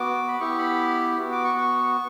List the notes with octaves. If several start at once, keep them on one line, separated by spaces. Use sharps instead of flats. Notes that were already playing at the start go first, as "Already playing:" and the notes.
Already playing: B3 F#4 D6
B5
B3 E4 G4 C#6
B5
B3 F#4
D6
C#6
C#6